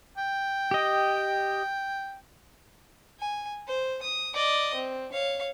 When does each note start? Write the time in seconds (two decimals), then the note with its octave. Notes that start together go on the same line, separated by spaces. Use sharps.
0.18 G5
0.71 G4 D#5
3.20 G#5
3.67 C5
4.03 D#6
4.34 D5 D#5
4.75 C4
5.12 C#5 F5